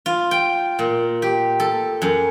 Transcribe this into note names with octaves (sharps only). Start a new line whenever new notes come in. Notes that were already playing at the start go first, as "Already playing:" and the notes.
F4
G5
A#2
G4
A4
F#2